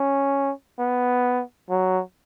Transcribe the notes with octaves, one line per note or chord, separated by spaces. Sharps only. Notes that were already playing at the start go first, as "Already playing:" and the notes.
Already playing: C#4
B3
F#3